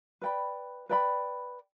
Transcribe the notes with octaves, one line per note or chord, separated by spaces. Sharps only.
B4 D5 G5 B5
B4 D5 G5 B5